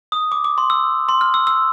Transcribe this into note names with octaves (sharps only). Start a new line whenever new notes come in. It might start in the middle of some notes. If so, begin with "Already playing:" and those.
D#6
D6
D6
C6
E6
C6
F6
E6
E6